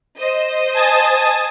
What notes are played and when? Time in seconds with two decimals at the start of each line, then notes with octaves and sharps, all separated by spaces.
0.19 C5 D#5
0.74 G#5 A5 D#6